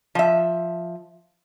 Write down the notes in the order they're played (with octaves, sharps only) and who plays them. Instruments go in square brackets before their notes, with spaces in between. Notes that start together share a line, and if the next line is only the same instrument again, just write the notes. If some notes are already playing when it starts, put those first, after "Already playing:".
[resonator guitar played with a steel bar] F3 E5